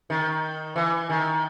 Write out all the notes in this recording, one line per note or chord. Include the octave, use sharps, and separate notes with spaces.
D#3
E3
D#3